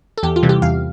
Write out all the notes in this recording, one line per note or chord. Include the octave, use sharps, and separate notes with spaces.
A4
E2 G4
F4
C3 E3 G3
G4
E2 F5